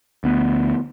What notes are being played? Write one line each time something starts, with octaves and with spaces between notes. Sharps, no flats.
D2 B3